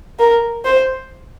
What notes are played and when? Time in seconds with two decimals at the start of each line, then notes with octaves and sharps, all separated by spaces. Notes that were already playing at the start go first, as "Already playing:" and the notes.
0.19 A#4
0.65 C5